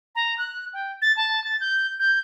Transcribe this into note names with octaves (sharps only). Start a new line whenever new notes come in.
A#5
F#6
G5
A6
A5
A6
G6
G6